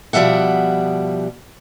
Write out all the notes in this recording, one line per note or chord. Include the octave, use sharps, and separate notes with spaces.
B2 F3 G3 E5 F#5